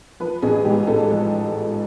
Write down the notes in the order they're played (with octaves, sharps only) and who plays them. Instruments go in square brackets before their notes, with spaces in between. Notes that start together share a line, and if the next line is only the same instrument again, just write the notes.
[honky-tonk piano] F3 B4
A1 G#4
G#2 G4
A1 A4
F3